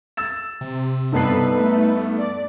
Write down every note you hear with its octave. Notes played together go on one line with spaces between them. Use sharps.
E6 A6 E7
C3
G2 B3 D#4 A4 B4 C7
A3
D5